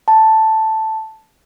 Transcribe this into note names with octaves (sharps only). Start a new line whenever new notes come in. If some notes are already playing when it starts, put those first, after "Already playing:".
A5